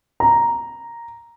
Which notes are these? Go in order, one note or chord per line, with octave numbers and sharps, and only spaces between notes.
A#5